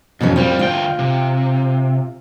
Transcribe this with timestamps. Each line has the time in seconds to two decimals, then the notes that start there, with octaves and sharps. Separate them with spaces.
0.21 F2 B2 E3 C#4
0.36 F2 G3 C4 F4
0.59 D2 F4 G5
0.99 C3